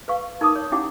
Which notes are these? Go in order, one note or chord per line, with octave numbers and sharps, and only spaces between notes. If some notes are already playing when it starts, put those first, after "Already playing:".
B4 F5 C#6
D#4 A#4 A5 D6 D#6
C#5
C#4 E4 G4 F#5 G5 D6